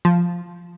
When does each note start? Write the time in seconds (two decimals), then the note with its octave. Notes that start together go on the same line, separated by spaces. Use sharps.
0.05 F3